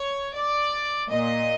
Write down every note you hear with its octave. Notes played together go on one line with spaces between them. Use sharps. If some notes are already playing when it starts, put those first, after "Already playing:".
Already playing: C#5
D5
A#2 D#5